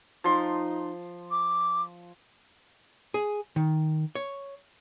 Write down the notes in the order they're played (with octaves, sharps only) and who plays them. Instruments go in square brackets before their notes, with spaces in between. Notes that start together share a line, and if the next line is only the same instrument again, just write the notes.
[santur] F3 C6 [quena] D#4
[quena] D6
[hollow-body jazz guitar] G#4
D#3
C#5